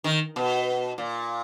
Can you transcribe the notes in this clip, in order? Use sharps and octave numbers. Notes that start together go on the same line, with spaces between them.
D#3
B2
A#2